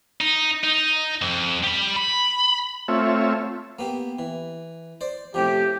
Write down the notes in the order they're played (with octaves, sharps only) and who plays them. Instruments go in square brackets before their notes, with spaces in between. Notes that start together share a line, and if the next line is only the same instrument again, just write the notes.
[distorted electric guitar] D#4
D#4
F2
G4 B5
B5
[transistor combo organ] A3 C4 F4 C#5 E5
[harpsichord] A#3 B3 G4
E3
C5 D5
[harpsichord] A2 C3 F3 [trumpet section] G4